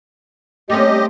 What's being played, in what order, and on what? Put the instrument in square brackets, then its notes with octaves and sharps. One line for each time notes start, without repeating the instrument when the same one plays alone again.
[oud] G3 C#4 [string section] A3 A#3 C4 [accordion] G4 D#5